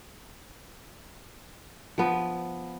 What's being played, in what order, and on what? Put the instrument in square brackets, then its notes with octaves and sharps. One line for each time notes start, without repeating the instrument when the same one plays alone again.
[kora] F3 B3